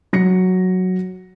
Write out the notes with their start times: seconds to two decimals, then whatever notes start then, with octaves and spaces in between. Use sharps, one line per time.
0.13 F#3 A#6 C#7